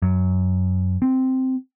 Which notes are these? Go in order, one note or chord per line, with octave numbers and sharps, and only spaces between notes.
F#2
C4